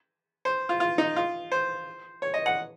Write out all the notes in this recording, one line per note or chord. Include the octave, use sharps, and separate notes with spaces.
C5
F4
F4
D#4
F4
C5
C#5
D#5
F#5